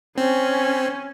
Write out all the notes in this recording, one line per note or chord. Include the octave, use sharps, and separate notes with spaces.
C4 C#4